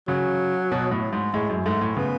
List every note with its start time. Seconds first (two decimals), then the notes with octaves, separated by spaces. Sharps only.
0.08 C#3 F#3
0.72 B2
0.91 A2
1.13 G#2
1.34 A2 G#3
1.49 F#2
1.65 G#2 A3
1.81 A2
1.97 C#3 B3